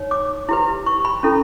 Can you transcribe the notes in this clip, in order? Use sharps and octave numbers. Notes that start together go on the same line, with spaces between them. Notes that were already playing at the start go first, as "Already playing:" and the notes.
Already playing: D#4 C#5
D6
E4 G4 B4
C#6
B5
C#4 E4 A4